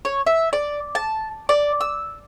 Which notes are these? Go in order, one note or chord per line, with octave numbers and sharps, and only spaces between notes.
C#5
E5
D5
A5
D5
E6